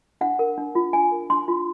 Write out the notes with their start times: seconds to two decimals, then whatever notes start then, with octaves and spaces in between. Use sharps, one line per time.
0.21 D4 F#5
0.39 A#4
0.58 D4
0.75 F4
0.93 D4 G#5
1.11 A#4
1.30 D4 C6
1.48 F4